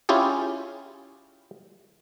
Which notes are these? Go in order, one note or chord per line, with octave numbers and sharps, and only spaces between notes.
C#4 E4 F4 G4 G#4